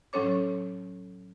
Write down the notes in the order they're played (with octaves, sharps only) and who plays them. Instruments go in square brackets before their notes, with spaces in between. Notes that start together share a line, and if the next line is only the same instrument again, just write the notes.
[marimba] A2 F#3 C#4 A4 C#5 D6